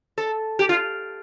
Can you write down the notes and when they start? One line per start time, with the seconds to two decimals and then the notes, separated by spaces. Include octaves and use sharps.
0.18 A4
0.59 G4
0.69 F4